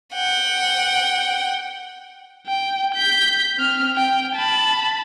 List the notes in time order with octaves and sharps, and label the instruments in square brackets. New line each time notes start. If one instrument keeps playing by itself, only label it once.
[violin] F#5 G5
[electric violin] G5
G6 B6
C4 F6
G5
A5 B5